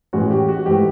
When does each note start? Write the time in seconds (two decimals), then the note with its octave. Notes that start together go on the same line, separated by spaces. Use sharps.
0.13 A2 E3 G#3 C#4 F#4
0.31 G4
0.49 F#4
0.66 G#2 E3 A3 G4